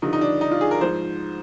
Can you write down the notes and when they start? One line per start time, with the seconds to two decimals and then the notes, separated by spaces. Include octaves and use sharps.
0.02 G2 D3 F3 D#4
0.13 D#4
0.21 D4
0.41 D#4
0.51 F4
0.61 G#4
0.71 A#4
0.81 G#2 F3 C5